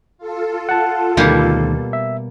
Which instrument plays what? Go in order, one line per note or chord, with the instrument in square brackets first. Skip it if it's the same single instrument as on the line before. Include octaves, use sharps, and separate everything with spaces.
[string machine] F4 A4
[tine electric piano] F#5 A5
[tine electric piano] D2 D#3 [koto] B2 G3 A#3
[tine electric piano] E5